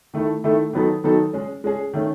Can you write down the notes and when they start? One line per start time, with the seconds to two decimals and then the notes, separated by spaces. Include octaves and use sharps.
0.14 D#3 A3 E4 A4
0.44 D#3 A3 E4 A4
0.73 D#3 F#3 B3 D#4 A4
1.04 D#3 F#3 B3 D#4 A4
1.33 G#3 C#4 G#4
1.64 G#3 C#4 G#4
1.93 D#3 A3 C#4